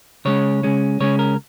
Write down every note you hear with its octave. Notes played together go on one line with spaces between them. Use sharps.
C#3 G#3 C#4 C#5
C#3 G#3 C#4
C#3 G#3 C#4 C#5
A#4